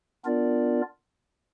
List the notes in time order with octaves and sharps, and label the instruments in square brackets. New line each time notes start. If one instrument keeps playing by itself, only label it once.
[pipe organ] B3 D4 F4 A#4 D5